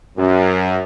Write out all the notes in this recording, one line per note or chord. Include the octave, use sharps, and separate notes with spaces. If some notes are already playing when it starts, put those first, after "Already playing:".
F#2